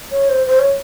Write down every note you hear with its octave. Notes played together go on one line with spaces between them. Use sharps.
C#5
C5
C5
C#5